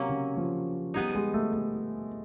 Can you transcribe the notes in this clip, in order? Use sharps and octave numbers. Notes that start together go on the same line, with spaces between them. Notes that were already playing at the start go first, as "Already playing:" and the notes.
Already playing: C3 F#3 A#3 C#4
C#3
F3
G3 B3 D#4 G#4 B4
G#3
A3
A3